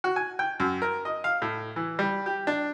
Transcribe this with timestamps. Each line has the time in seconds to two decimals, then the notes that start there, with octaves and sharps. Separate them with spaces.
0.04 F#4
0.16 G#5
0.39 G5
0.60 F#2
0.82 A#4
1.05 D#5
1.24 F5
1.42 A2
1.76 E3
1.99 G3
2.26 G4
2.47 D4